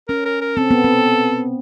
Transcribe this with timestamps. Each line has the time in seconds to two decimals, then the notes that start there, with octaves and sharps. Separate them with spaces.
0.08 C#4 A#4
0.25 A#4
0.41 A#4
0.57 C4 A4
0.71 B3
0.84 C4